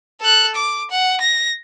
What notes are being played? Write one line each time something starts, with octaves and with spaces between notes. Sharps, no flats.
A4 F#6
D6
F#5
A#6